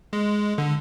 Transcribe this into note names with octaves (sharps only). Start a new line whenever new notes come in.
G#3
D3